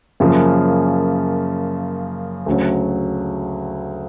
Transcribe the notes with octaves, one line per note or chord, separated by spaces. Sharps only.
F#2 C#3 F3 A#3
D2 C#3 F#3